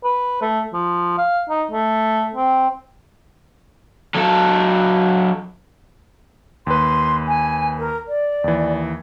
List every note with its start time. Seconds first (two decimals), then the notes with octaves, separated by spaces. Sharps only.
0.04 B4
0.42 A3
0.73 F3
1.18 F5
1.49 D#4
1.71 A3
2.35 C4
4.16 F#3 A4
6.67 D#2 B4 C6
7.27 G#5
7.78 A#4
8.08 D5
8.44 D#2 E3